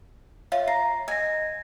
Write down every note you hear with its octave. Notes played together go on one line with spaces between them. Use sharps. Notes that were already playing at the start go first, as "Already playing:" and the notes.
F4 C#5 E5 F5
A#5 C7
D#5 G#5 A#6